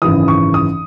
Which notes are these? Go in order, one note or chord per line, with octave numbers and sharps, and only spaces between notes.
G#1 F#2 C#3 E3 D#6
C#6
D#6